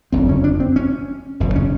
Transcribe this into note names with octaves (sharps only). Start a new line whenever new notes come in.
F#1 F2 D3 C4
C#4
D4
C4
C#4
F#1 E2 B2
C#4